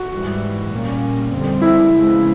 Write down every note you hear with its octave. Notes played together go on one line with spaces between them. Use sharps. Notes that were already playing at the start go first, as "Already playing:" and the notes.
Already playing: F#4
G#2 E3 G3
A#2 G3 A#3 C#4
F2 D3 G3 C4
E4
C#3 F3 G#3 B3